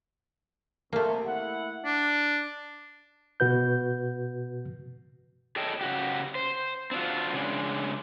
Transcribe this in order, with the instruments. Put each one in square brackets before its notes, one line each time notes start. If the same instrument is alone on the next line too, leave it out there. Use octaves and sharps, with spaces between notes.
[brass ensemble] C2 C3 [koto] A3 A#3
[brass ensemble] E4 E5 F#5
[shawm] D4
[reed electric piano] B2 F#4 B4 G6
[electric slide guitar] G#4 A4 C#5 D#5 G5 A5
C#3 F#4 G4
C5
C4 D4 F4 F#4
C#3 G#3 D4